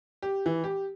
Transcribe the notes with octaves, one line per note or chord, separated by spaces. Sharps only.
G4
E3
G4